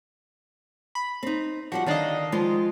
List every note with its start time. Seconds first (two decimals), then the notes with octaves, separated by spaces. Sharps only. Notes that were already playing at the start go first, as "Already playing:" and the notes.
0.95 B5
1.23 C4 D#4
1.72 F3 G3 F#4 F#5
1.86 D3 D#3 D4 D5 D#5 F5
2.32 F3 G#3 F4